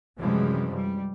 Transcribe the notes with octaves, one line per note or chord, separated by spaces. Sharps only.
F#2 C3 E3 F3 G3 G#3
G3